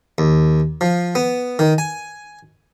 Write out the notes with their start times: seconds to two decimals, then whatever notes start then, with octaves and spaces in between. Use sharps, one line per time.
0.18 D#2
0.81 F3
1.15 B3
1.59 D#3
1.78 G#5